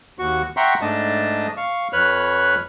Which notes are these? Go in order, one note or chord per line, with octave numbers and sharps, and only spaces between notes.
D#2 F#4 C#6
E5 F#5 G5 A#5 C6 C#6
G#2 A3 D4 D#5 A5
F5 C#6
F2 B4 C#5 F6 F#6